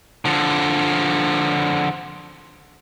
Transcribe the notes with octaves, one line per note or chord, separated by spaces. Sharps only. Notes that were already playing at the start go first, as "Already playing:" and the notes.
D3 F3